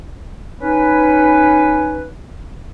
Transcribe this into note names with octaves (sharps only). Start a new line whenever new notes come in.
C#4 D#4 B4